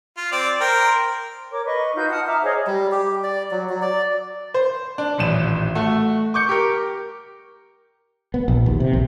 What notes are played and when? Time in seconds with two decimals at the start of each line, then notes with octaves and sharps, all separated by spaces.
0.17 F4
0.32 C4 D5
0.60 A#4 C5 G5
1.51 A#4 C#5 D6
1.65 B4 D#5 C#6
1.95 D#4 F4 F#4 G6
2.09 F#5 A5 D#6 F6
2.26 E5 A#5 D6 F6
2.42 G#4 C5 C#5 D#5
2.67 G3
2.92 G4
3.24 D5
3.51 F#3
3.70 F#3
3.82 D5
4.54 C5
4.98 D4
5.18 D#1 A1 E7
5.75 A3 F#4
6.34 C#6 D6 G6 C#7
6.49 G4 A#4
8.34 B3
8.48 A#1
8.66 D#2
8.80 C3
8.93 A#1